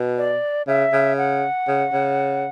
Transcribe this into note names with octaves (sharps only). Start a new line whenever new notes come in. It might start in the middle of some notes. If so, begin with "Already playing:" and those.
Already playing: B2
D5
C#3 E5
C#3
F#5
C#3
C#3